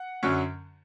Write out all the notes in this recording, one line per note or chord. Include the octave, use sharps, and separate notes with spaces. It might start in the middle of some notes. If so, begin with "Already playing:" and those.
Already playing: F#5
F#2 D3 F#3 C#4